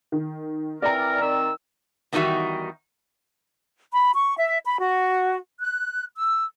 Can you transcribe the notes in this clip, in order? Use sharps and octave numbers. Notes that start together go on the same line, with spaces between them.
D#3
E3 C4 A#4 D5 A#5
D#3 C4 E6
E2 D#3 G3 D#4 F#4 E5
B5
C#6
E5
B5
F#4
F#6
E6